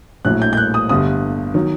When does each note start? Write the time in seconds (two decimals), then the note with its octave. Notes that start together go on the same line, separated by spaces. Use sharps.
0.25 A#1 A2 F#3 F#6
0.42 G6
0.53 G6
0.57 F#6
0.74 D#6
0.89 G1 G2 D3 D#6
1.54 D#3 F#3